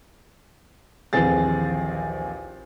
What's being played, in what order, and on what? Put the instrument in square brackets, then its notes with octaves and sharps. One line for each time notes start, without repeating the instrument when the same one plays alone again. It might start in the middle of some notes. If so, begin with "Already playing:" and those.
[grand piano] A#1 D#2 E3 C4 G#4 A6